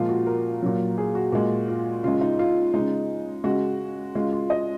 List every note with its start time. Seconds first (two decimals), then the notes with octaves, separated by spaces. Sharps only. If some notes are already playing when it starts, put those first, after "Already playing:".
Already playing: A#2 F3 G#3 F4
0.09 F#4
0.27 A#4
0.63 A#2 F#3
0.98 G#4
1.15 F#4
1.32 A#2 G#3
1.68 F4
2.03 C#3 G#3 F4
2.21 D#4
2.39 F4
2.74 C#3 G#3 D#4
3.44 C#3 G#3 F#4
4.15 C#3 G#3 F4
4.33 F4
4.50 D#5